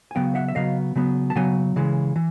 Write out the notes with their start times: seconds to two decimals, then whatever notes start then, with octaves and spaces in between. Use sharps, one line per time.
0.11 G#5
0.15 C#3 F#3 B3 F5 G5
0.35 E5 F#5
0.48 E5
0.55 C#3 F#3 B3 D#5 F5
0.95 C#3 F#3 B3
1.30 A5
1.35 C#3 F#3 B3 F#5 G#5
1.76 C#3 E3 G#3
2.16 E3